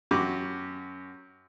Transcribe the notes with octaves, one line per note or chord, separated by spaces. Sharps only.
F#2 F#4 G4 D6